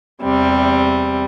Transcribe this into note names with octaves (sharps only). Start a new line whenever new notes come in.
E2 C3 G3